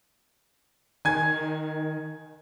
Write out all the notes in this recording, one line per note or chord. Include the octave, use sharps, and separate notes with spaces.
D#3 G#5 G#6